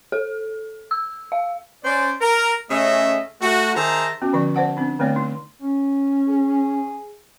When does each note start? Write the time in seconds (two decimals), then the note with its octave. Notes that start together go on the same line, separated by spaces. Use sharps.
0.12 A4
0.91 E6
1.32 F5
1.84 C#4 C5 D5
2.21 A#4
2.69 C#3 A3 C#4 G#4 D#5 E5
3.41 A3 F#4
3.76 D#3 G#4 C5 E5 A5 A#5
4.22 B3 C#4 F#4
4.33 D3 F3 D5 C#6
4.55 C5 D5 F#5 A5
4.77 C4 D4
4.99 D3 A3 B3 C4 C#5 D5
5.16 D#4
5.62 C#4
6.28 G#4